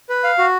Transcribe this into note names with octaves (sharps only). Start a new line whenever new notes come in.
B4
F5
F#4